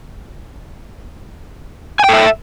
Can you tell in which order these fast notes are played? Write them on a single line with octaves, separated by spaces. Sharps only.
G#5 G5 A4 E5